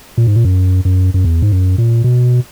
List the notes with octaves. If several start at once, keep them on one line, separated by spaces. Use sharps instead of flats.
A#2
G#2
A#2
F#2
F#2
F#2
E2
G#2
F#2
A#2
B2